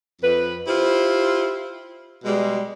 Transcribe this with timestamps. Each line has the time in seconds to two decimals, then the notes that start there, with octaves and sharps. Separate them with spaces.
0.22 F2 B4
0.68 E4 F4 G4 C5
2.25 B2 G3 G#3